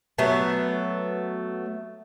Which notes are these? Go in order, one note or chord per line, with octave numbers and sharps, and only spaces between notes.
F#3 A3 B3